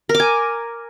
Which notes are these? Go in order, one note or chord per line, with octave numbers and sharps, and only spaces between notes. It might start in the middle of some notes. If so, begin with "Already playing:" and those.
A#4
D6
G#5